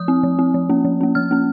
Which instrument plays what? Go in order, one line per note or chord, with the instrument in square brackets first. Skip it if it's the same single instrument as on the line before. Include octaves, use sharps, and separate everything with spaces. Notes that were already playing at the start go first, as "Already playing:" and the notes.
Already playing: [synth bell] F3 D#6
C4
F3
C4
F3
A#3 C#4
F3
A#3 C#4
F3 F6
A#3 C#4